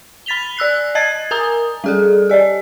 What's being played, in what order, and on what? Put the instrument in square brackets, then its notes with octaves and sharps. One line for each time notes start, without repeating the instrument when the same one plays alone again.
[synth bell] B5 A6 B6 F7 G7
D5 E6 F#6 C7
D#5 A5 G#6 A6
A#4 G#5 A#5 D#6
G3 G#4 A4
G4 D5 D#5